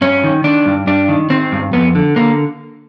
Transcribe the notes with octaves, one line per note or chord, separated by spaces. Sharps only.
G2 C#4
D#3
D#3 D4
G2
G2 D4
D#3
D#3 C4
G2
F2 B3
D3
D3 A#3